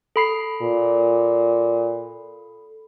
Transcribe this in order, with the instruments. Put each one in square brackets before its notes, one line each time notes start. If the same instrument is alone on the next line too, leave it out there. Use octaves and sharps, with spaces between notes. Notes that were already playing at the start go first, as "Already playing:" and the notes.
[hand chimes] A4 B5 C7
[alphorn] A#2